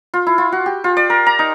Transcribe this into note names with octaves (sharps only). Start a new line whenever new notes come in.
F4
E4
F4
F#4
G4
F4
D5
A#4
A#5
D#4